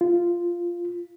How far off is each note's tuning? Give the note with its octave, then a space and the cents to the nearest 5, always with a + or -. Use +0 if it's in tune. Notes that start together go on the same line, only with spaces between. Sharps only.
F4 -5